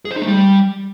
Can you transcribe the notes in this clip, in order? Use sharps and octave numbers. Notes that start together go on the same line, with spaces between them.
G#4
C5
D#4
A3
G3